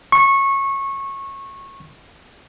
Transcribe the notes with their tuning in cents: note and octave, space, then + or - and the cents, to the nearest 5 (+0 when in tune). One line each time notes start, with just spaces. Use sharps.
C#6 -20